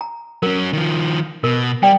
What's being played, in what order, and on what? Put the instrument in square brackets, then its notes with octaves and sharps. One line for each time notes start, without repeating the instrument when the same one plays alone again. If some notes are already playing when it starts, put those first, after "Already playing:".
[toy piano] A#5
[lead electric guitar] F#3 C#4 [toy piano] A#4
[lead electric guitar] D#3 F3
[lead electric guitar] B2 [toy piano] A#4
[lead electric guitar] G3 [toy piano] D5 G5